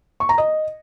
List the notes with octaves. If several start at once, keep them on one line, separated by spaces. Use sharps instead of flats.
C#6
A#5
D#5